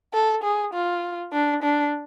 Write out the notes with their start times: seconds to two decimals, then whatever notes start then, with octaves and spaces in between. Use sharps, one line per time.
0.14 A4
0.44 G#4
0.74 F4
1.33 D4
1.63 D4